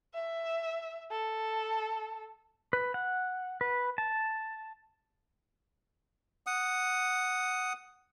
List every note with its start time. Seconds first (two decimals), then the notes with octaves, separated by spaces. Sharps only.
0.14 E5
1.11 A4
2.73 B4
2.94 F#5
3.61 B4
3.98 A5
6.46 F#5 D#6